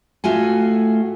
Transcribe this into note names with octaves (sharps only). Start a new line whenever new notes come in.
A2 A3 F4 F#4 G#5